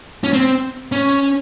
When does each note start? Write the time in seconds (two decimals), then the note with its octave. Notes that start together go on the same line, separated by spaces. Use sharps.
0.24 C#4
0.33 C4
0.92 C#4